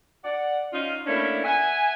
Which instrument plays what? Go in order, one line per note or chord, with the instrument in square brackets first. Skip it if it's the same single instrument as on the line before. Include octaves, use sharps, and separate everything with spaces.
[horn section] D5 F#5
C#4 D#4 F4
A3 A#3 C#4 D4 E4
E5 F#5 G#5